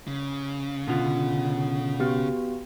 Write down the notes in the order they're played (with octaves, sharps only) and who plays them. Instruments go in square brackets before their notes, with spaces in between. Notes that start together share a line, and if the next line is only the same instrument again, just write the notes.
[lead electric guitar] C#3
[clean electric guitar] B2 [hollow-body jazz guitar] D3 F4
[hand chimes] B3 F#4 G4